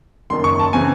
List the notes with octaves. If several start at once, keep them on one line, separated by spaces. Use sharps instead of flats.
F#1 F#2 D#3 C6
C#6
A5
C#3 E3 C4 G#5